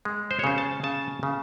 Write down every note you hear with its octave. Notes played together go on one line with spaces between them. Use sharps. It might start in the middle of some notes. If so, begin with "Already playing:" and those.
G#3
C5
C#5
C#3 C5
A5
C#3 A5
C#3